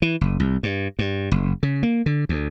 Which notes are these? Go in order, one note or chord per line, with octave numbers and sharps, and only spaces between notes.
E3
F#1
C2
G2
G2
F#1
C#3
A#3
D3
D2